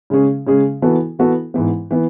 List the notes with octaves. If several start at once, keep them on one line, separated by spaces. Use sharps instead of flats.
C#3 G#3 C#4 G#4
C#3 G#3 C#4 G#4
E3 B3 F#4 A4
E3 B3 F#4 A4
G#2 E3 B3
E3 B3